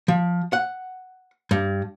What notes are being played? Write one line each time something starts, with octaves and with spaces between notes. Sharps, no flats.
F3
F#5
G2